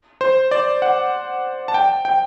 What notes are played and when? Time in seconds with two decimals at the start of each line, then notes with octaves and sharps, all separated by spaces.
0.21 C5
0.51 D5
0.82 F#5
1.68 A5
1.74 G5
2.05 G5